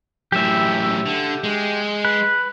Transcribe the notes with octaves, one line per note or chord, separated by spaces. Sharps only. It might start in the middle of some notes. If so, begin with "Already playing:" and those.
F#2 A2 G4 E5
D3
G#3
B4